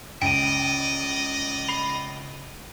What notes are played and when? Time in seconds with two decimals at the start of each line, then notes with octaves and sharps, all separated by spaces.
0.22 C#2 D5 D#5 G5 D7 D#7
1.69 B5 C7 G7